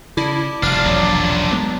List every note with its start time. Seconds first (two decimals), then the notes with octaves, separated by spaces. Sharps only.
0.17 C#3 E4 D5 A5 D6
0.63 F1 G2 D4 F4 F6
0.85 E1 A#1 C3 F#3
1.52 G#3 B3